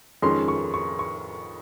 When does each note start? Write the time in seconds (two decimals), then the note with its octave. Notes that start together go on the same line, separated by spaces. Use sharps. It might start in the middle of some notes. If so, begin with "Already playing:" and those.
0.22 F2 D#3 G#3 C#4 C6
0.48 C#6
0.74 C#6
0.99 C#6